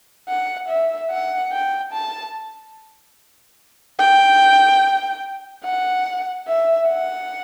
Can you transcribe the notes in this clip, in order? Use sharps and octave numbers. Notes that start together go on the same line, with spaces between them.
F#5
E5
F#5
G5
A5
G5
F#5
E5
F#5